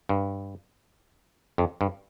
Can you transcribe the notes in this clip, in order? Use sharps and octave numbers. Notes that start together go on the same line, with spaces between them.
G2
F2
G2